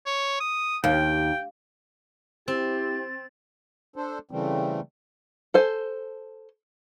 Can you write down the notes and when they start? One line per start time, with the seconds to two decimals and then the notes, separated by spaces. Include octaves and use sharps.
0.06 C#5
0.40 D#6
0.84 D#2 G5
2.48 C4 E4 G4 A6
3.96 D4 A4 C5
4.31 C#3 E3 G3 A3 C4
5.54 A4 C5 G#5